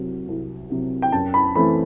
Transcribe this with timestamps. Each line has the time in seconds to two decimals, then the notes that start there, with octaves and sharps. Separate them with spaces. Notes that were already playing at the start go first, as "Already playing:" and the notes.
Already playing: C2 C3 F#3
0.28 C2
0.70 C3 F#3
1.02 G5
1.12 F#2 A5
1.34 B5
1.55 E3 A3 C4 B5